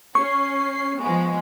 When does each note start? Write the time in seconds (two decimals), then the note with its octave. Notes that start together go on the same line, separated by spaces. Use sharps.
0.15 C#4 C#6 C7
1.00 F3 G#3 B3